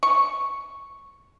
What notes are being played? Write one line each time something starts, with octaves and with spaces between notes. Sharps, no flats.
C#6